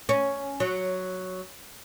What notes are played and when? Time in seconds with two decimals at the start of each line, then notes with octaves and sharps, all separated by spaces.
0.09 C#4
0.60 F#3